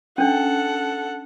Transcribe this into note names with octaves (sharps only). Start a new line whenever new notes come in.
C#4 D4 A4 F#5